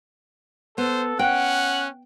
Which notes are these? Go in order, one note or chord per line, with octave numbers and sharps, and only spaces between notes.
B3 A4 C5
C#4 F#5 G5 F#6